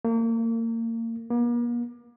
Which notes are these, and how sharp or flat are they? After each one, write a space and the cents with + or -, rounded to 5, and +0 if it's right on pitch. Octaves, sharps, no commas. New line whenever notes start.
A#3 -30
A#3 +45